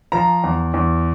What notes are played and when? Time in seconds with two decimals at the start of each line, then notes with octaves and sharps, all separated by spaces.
0.12 F3 A#5
0.44 E2
0.74 E2